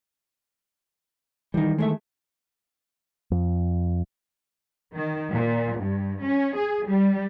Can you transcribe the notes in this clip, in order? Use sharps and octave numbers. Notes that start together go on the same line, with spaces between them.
D#3 E3 G3 D#4
G#3 A3 E5
F2
D#3
A#2
G2
C#4
G#4
G3